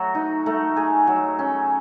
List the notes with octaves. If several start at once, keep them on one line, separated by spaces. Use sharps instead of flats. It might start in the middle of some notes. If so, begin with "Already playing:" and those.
Already playing: F#3 A3 F#4
D#4
A3
G#4
F#3
C#4